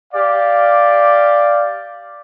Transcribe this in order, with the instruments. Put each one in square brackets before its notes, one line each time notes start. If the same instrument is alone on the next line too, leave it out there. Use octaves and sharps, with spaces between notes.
[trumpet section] G4 D5 F5